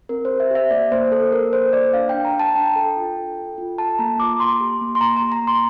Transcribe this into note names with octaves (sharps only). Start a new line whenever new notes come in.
C4 A#4
C5
G4
E5
G4 E5
A#3 D5
A#3 C5
A#3 A4
A#3 A#4
A#3 C5
A#3 D5
D4 F5
G5
D4
A#5
D4 A5
D4 G5
A4
F4
A4
A4
F4
A4 A5
A#3 A#5
F4 D6
A#3 C6
G4
A#3
C6
A#3 A#5
A#5
G4
A#5
A#3
C6